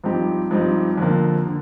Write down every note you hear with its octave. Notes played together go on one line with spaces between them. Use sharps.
G2 F3 C4 D#4 G4
G2 F3 C4 D#4 G4
F2 D3 F3 A#3
D3